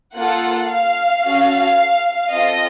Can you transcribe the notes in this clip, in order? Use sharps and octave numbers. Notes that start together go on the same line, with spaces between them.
A#3 F4 A4 F#5
F5
C#4 F#4 A4
C4 F4 A4 D#5